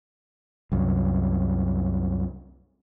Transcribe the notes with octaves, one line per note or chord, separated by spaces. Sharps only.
C2 F#2